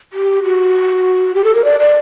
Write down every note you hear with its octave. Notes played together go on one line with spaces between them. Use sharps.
G4
F#4
G4
A4
A#4
D5
D5